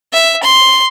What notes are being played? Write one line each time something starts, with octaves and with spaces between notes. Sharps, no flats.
E5
C6